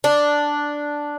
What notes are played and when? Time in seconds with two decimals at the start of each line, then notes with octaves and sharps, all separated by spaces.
0.04 D4